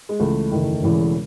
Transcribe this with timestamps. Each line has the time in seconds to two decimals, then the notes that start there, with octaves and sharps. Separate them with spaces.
0.09 G#3
0.20 C#2 C#3 E3 A3
0.52 F#1 E2 D#3
0.83 E1 E2 C#3 E3